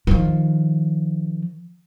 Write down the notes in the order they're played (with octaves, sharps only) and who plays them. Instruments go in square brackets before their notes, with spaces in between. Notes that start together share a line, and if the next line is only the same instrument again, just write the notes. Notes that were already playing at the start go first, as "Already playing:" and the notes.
[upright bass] D#3 F3